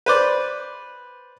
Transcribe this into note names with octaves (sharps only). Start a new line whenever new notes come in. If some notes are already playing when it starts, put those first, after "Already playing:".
B4 C5 D5